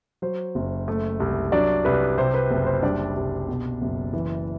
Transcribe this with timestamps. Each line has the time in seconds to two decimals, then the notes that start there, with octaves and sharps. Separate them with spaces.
0.22 F#3 C5
0.55 F#1
0.88 A3
1.20 C2
1.52 F#3 D4 D5
1.85 C2 B4
2.18 C3 C5
2.34 B4
2.51 F#1
2.66 C5
2.82 G3 D4 D5
3.16 C2
3.48 B2
3.82 F#1
4.13 E3